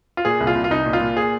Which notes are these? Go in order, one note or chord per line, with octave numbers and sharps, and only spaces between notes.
F4
A#2 G#4
C2
F4
C2
F4
C2 D#4
A#2
F4
A#2
G#4